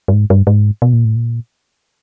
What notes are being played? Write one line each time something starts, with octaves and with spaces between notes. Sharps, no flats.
G2
G#2
G2
G#2
B2
A#2
A2
A#2